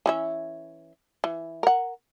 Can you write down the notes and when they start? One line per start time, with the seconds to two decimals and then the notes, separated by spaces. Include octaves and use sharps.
0.06 E3 C#4 E5
1.24 E3
1.63 A#4 F#5